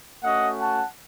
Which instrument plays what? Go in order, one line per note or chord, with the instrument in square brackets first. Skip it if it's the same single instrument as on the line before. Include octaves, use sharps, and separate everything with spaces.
[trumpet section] A3 C#4 F#4 D#5 F#5
F#5 A5